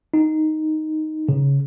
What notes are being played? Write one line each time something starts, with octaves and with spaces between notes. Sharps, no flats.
D#4
C#3